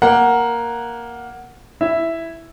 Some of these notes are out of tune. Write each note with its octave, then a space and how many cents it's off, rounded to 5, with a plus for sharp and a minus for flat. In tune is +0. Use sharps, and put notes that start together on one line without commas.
A#3 +5 F#5 +0
E4 +0 E5 +0